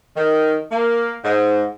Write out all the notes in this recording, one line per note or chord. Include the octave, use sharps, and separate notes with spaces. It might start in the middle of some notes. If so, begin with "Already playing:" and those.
D#3
A#3
G#2